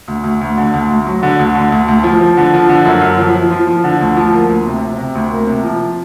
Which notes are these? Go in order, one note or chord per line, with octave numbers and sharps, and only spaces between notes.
D2
D2
D2
D3
D2
D2
F#3
D3
D2
D3
D2
D2
F3
F3
D3
F3
D3
F#2
F#2
F3
F3
F3
F3
D3
D2
F3
A#3
D2
C3
C3
C3
D2
A#3
C3
F3